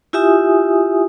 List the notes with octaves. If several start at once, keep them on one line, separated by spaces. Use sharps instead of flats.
E4 F4 G4 E5 G#5 D#6